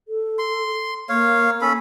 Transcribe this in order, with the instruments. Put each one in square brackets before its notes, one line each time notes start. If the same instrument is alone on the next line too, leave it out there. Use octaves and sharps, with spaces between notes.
[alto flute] A4
[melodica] C6
[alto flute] A#3 [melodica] C#5 F5
[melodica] C#4 A4 B5